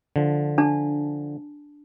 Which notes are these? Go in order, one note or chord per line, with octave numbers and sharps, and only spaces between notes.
D3 F3
D4 A5